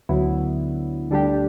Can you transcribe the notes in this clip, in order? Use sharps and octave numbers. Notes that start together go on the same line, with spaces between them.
D2 D3 F#3 B3 E4
D2 D3 G3 D4 G4